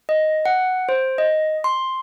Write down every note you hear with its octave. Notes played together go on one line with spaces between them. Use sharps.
D#5
F#5
C5
D#5
C6